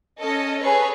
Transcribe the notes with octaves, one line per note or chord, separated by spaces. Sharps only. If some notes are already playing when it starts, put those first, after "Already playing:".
C#4 A4 D#5
G#4 A4 B4 C#5